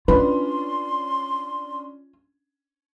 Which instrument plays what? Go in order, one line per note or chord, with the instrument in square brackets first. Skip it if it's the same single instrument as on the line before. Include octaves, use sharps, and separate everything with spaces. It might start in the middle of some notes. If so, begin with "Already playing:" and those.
[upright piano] C#4 D4 [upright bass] F4 [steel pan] B4 [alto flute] C6